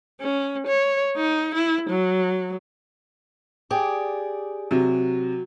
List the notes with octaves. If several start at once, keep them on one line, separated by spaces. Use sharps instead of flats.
C#4
C#5
D#4
E4
F#3
G4 G#4 D5
C3 F#3